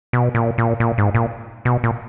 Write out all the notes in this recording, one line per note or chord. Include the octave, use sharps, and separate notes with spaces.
B2
A#2
A#2
A#2
G#2
A#2
B2
A#2